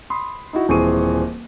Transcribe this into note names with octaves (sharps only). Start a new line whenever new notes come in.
B5 C6 D#6
D#4 E4 F#4
D#1 E3 C4 G#4 C#6 D#7